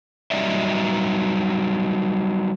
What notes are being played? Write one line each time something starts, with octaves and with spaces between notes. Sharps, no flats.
F#3 G3 D#4 D5 E5